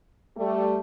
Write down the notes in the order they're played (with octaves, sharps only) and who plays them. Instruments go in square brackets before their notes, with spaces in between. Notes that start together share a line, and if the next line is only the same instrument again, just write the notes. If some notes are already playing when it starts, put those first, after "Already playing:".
[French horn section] G3 A3